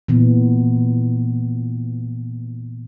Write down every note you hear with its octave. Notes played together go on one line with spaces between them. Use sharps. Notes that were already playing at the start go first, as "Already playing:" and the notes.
A#2 E3 B3